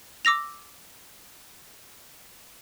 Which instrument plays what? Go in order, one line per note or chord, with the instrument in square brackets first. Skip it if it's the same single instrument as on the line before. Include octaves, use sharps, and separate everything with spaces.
[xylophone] D6 E6 A#6 F7